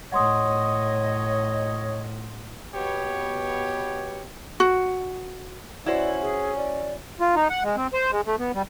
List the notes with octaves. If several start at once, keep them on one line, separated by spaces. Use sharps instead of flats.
A2 C#5 D#5 F#5 C6 D#6
B2 B3 G4 C#5
F#4
C#4 E4 F#4 C5 D5
G#4
D5
F4
D#4
F#5
G#3
C4
C5
G#3
A3
B3
G3